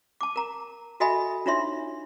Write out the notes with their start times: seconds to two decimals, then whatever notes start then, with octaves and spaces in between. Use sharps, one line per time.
0.21 A5 D6
0.36 A#4 A#5
1.00 F#4 A4 D#5 E5 G#5 B5
1.46 D4 D#4 F4 C#5 E5 C6